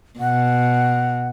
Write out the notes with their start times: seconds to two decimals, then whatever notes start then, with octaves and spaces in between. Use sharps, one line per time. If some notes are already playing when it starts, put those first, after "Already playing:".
0.20 B2 F#5